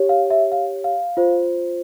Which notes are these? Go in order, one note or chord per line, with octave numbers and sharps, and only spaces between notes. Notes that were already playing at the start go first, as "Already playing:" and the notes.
Already playing: G4 C#5
F5
E5
F5
F5
F4 C5